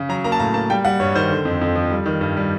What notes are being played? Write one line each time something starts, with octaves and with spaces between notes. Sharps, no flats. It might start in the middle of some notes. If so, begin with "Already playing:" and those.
Already playing: C#3
F#3 A#5
A#3 A#5
A5
A2 A#5
A#3 A5
G3 G5
G3 F#5
G2 C#5
D#3 C5
D3
F2
F2
F3
G3
D#3
G2
G3